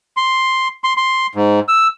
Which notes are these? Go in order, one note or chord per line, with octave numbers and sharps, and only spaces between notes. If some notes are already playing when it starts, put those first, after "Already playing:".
C6
C6
C6
G#2
E6